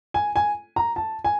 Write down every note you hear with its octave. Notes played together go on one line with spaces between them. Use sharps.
G#5
G#5
A#5
A5
G#5